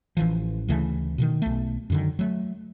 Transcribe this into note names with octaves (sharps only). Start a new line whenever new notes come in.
A1 E3 F3
D2 C#3 E3 A3
B2 D3 D#3
B1 A3
F#2 D3 D#3
F#3 A3